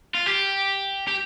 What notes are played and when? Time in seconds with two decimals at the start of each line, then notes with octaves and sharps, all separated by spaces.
0.14 F4
0.26 G4
1.08 G4